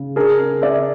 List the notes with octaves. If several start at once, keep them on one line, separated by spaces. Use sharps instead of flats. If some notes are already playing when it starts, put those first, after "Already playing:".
Already playing: C#3
D4 G#4 A#4
C#3
C#3 D5 E5